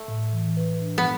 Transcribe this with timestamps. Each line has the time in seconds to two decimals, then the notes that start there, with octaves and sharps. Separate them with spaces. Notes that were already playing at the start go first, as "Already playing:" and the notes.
Already playing: A3
0.08 A2
0.33 E3
0.57 B4
0.81 D4
0.98 B3